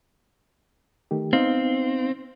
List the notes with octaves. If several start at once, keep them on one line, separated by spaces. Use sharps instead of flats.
D#3 A3 G4
B3 C4 D#4 F5